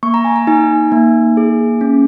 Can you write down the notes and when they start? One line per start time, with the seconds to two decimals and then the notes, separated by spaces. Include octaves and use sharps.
0.03 A#3 C#6
0.14 A#5
0.25 G#5
0.36 A#5
0.47 D#4 G#5
0.92 A#3
1.37 G#4
1.81 C#4